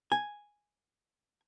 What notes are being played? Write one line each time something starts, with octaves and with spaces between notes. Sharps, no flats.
G#5